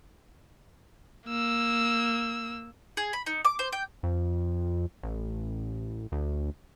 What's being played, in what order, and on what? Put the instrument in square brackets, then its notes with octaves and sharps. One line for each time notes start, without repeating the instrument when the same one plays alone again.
[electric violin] A#3 E6
[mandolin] G#4
B5
D#4
D6
C5
G5
[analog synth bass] F2
A1
D2